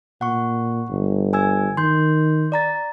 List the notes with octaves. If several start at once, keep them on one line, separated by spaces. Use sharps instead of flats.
A#2 F#5 C#6
G1
G#5 E6 G#6
D#3 C6 G6
D5 A#5 A6